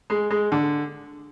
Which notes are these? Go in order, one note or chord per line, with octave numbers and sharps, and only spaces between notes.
G#3
G#3
D3